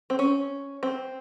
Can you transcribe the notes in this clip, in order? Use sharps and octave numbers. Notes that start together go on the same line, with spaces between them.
C4
C#4
C4